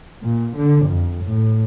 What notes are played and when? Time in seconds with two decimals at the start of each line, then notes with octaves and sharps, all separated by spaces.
0.23 A#2
0.57 D3
0.86 F2
1.24 A2